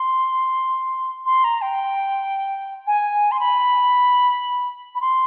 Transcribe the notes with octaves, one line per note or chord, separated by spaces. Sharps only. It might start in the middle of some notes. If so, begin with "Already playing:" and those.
Already playing: C6
C6
A#5
G5
G#5
C6
B5
B5
C6